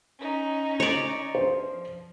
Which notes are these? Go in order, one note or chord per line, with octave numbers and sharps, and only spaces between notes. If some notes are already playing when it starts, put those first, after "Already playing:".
C#4 D#4
C#5 D5
F3 C5